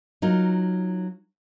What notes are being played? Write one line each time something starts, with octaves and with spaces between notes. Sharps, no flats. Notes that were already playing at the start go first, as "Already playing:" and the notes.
F#3 D#4 F4 A#4